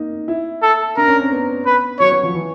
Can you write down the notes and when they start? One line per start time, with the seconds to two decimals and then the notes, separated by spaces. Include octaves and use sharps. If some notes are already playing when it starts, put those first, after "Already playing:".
Already playing: A#3 D#4
0.28 E4
0.62 A4
0.97 D4 A#4
1.08 C#4
1.20 C4
1.32 B3
1.66 B4
2.00 F#3 C#5
2.12 F#3
2.23 F3
2.35 E3